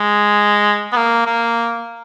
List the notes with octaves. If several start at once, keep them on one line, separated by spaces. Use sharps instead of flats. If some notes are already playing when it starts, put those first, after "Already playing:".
Already playing: G#3
B3
A#3
A#3